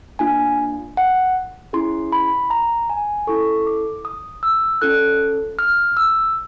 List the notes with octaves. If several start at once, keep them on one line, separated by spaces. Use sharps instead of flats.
A#3 D4 F4 G#5
F#5
C#4 E4 G#4 C6
B5
A#5
G#5
C#4 E4 A4 C#6
D6
D#6
E6
C#4 F4 A4 F#6
F6
E6